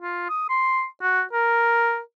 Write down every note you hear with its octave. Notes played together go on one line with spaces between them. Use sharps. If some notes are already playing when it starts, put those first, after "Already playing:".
F4
D#6
C6
F#4
A#4